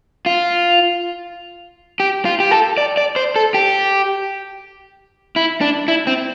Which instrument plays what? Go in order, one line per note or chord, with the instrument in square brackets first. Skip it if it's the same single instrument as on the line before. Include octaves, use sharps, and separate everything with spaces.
[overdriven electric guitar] F4
G4
F4
G4
A4
D5
D5
C5
A4
G4
E4
D4
E4
C4